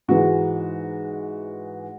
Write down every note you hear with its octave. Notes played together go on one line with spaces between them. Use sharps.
G#2 E3 G#3 F#4